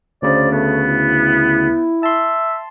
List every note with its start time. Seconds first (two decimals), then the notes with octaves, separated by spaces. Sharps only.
0.22 D2 C#3 C5 D5
0.52 A3 B3
0.87 E4
2.03 E5 A5 C6